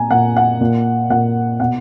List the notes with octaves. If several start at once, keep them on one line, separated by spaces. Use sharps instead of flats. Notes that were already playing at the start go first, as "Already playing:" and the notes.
Already playing: A#2 G#5 A#5
A#2 F#5
F#5
A#2
A#2 F#5
B2 F#5